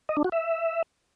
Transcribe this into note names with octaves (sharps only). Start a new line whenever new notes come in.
D#5
D4
F#4
E5